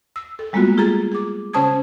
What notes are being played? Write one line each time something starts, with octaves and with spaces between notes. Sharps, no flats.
E6
A4
G3 G#3 A#3 B3 F4 F#4
F4 G#4 A4 A#5 A6
G#4 D6
C#3 C#4 C5 A5 D#6 G#6